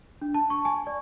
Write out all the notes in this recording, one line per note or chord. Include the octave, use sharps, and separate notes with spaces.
D4
A5
C#6
G#5
D5